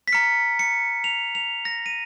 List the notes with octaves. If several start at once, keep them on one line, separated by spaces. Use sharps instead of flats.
B6
A#5 F6 C#7
C#7
F7
F7
A#6
D#7